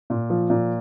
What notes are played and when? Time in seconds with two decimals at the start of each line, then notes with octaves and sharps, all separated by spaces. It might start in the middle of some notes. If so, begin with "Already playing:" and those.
0.10 A#2
0.30 F3
0.50 A#2